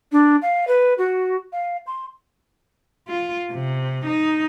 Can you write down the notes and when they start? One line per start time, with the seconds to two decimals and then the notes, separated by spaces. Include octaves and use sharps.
0.12 D4
0.42 F5
0.67 B4
0.98 F#4
1.52 F5
1.87 C6
3.09 F4
3.52 C3
4.06 D#4